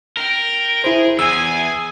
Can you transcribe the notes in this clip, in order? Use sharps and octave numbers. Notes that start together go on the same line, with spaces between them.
A#4 G5
E4 G#4 C5
E2 G#4 G#5 E6